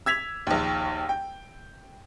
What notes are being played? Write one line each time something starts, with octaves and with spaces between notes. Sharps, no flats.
E6 G#6 B6 F7
A#1 D#2
G5